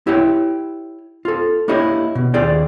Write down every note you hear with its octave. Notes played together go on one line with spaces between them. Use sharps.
E4 G4 C#5 G5
F4 A4
A#3 D4 E4 G4 C#5 D#5
B2
D#2 F4 G#4 D5 G5